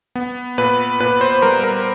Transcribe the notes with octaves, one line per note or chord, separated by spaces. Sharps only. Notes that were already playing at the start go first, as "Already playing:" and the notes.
B3
A#2 B4
A#2 B4
C5
G3 A#4
A#4